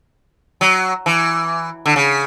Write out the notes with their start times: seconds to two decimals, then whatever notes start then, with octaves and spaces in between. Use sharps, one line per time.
0.61 F#3
1.06 E3
1.86 D3
1.96 C#3